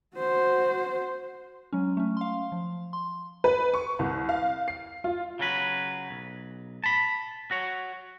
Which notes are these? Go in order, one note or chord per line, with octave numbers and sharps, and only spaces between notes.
F#4 C5
F#3 G#3 C#4
A3 C#4
F5 C6
F3
C6
B4
C#6
C2
F5
C7
F4
C#3 F#3 B4
B1
A5 B5
F#4 C#5